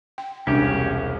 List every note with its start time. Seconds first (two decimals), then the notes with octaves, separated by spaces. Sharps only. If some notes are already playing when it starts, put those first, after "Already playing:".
0.18 G5
0.47 E1 C2 C#4 D4 G4